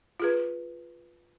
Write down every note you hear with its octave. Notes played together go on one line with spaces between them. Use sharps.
F4 G#4 B4